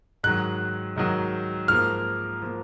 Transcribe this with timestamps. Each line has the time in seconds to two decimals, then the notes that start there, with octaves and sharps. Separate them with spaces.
0.23 G#2 D#3 F#3 F#6
0.96 G#2 D#3 F#3
1.68 G#2 F3 A#3 F6
2.42 F3 A#3